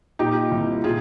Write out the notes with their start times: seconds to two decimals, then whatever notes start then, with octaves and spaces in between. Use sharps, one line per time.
0.19 A#2 D#4 G4
0.52 C2
0.84 A#2 F4 G#4